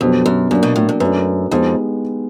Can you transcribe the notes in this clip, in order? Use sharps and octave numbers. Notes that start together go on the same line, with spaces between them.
F2 B2 F#3 B3 D4 G4
F#2
F#2 F#3 A#3 D4
B2
A2
G2
F#2 A3 D4 F#4 B4
F2 G#3 B3 D#4 G4